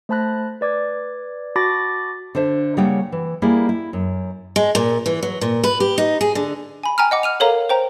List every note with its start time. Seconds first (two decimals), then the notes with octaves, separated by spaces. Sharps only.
0.09 A3 C5 A5 B5 F#6 A#6
0.61 B4 D5 D6 G#6
1.56 F#4 A5 B5 D6 A6 A#6
2.35 D3 D4 C5 E5
2.77 C#3 G3 A#3 C#5 F#5 G5
3.12 E3
3.42 G3 A#3 E4 G4 G#4
3.69 E4
3.93 F#2
4.56 G#3
4.75 A#2
5.06 E3
5.23 F#3
5.41 A#2
5.64 B4
5.80 G4
5.98 D#4
6.21 G#4
6.35 D3
6.83 G#5 B5
6.98 G5 G#5 A#5 F6
7.11 D#5 F#5 D6
7.23 F6 D#7 F7
7.40 A4 A#4 C#5 F5 A#5
7.69 C5 G5 A#5